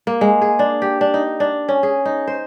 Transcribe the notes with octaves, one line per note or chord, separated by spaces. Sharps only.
A#3
G#3
G#4
D4
G4
D4
D#4
D4
C#4
G#4
D#4
C5